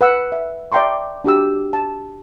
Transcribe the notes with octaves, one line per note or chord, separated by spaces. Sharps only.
B4 F#5 E6
E5
D5 E5 G5 A#5 C6 C#6
D4 F#4 G4 E6
A5